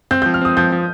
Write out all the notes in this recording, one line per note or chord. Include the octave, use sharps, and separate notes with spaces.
C4 G6
F3 G6
F6
C4 D#6
F3 G6
F3